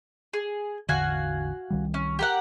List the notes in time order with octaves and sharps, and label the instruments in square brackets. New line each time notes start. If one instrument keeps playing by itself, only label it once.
[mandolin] G#4
[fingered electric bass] A1 E2 D3 [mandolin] F#4 F5 G#5
[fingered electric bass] C2 D#3 G3
[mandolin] C#4
G4 A#4 F#5